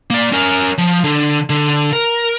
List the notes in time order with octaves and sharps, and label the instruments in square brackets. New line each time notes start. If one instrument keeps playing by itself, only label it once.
[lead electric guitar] A#3 D5
C#4 A#4
F3
D3
D3
A#4